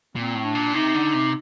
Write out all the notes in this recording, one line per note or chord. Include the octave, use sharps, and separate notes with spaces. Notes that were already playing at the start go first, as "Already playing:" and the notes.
A#2 C4
A2
D4
A#2
C3 D#4
D3
C3